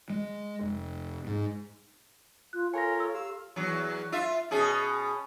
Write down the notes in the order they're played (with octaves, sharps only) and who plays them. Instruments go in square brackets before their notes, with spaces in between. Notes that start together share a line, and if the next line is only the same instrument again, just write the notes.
[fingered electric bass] G#3
F1
G#2
[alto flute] F4 [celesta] F#6
[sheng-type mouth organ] F4 A#4 C#5 [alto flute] A4 [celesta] G#5 A#6
[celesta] E6
[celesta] G4 [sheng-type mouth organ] F5 E6
[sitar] E2 F#3
F4 E5
B2 C#4 G#4